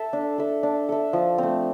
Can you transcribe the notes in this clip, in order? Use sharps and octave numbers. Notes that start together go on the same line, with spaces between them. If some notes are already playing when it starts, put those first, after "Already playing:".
Already playing: A4 E5
D4
A4 E5
D4
A4 E5
F3
A3 C4